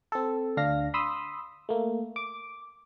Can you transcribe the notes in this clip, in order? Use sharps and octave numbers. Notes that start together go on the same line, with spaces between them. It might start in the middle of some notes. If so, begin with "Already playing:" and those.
C4 A4
D2 D4 F5 A#6
B5 C6 D#6 E6
A3 A#3
D6